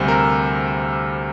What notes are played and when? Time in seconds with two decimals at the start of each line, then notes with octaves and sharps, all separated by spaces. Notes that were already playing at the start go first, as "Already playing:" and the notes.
Already playing: D2 C3 G3 C5
0.08 A#4